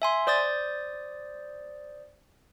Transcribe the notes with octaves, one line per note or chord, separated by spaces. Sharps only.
E5 G#5 C6
C5 D5 D#6 G6 A6